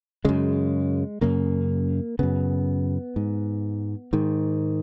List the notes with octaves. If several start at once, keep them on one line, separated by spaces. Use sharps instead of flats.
F#2 C#3 G#3
F#2 C#3 A#3
F#2 C#3 B3
G#2
G#2 D#3